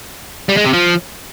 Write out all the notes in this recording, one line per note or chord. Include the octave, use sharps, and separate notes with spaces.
G3
G#3
C3
F3